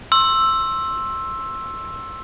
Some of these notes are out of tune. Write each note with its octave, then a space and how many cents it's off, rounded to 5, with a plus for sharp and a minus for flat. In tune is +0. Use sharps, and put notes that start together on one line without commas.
C6 +25 E6 +5